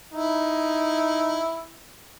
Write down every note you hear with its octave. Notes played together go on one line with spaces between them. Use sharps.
D#4 E4